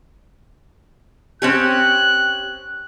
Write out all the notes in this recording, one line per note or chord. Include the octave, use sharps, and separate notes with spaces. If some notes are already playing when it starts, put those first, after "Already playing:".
C4 C#4 G4 F#6